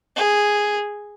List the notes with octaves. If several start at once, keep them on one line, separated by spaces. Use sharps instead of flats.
G#4